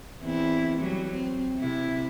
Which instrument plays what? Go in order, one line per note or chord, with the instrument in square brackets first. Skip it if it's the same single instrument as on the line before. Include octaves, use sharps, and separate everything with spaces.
[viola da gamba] E2 C4 E4
F#3 G3
C4
C3 E4